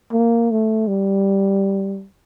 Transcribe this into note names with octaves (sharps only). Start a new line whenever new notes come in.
A#3
A3
G3